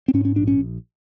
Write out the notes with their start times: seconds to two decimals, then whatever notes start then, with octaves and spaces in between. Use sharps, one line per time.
0.08 C4
0.14 G#2 C#4
0.25 C#4
0.36 A#1 D4
0.48 C#4